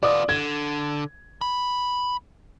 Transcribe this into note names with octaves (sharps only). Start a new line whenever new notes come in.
B3 F4 D5 D6 D#6
D3 G#6
B5